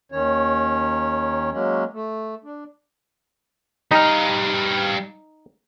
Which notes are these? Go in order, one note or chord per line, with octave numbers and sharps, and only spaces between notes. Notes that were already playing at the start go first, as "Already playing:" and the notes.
D#2 D#3 C#4 C#5
F#3 G#3 A#3 C#4
A3
D4
G3 D#4 F5